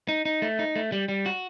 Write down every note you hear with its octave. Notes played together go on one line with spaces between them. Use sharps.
D#4
D#4
A3
D#4
A3
G3
G3
F#4